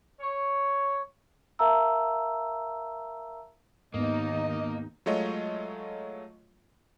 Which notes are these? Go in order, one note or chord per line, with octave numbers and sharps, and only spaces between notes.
C#5
A#4 E5 F5 A5 A#5 E6
D#2 G#2 A#3 B3 D#4 D#5
F#3 G#3 A3 F4 C#5 D#5